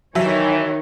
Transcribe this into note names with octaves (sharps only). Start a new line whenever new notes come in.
D#3 E3 F#3 C#5 E5